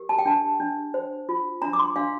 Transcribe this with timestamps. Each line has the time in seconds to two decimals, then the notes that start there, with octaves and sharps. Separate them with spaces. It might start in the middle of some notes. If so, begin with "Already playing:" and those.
Already playing: G4 A#4
0.09 A5
0.18 G5
0.25 D4 A5
0.60 D4
0.94 C5
1.29 F4
1.62 D4 A#5
1.73 D6
1.79 C6
1.96 D4 F5